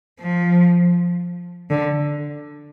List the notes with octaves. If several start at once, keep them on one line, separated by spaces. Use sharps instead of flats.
F3
D3